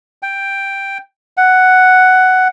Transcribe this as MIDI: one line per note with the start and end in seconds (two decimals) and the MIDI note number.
0.23 0.98 79
1.37 2.48 78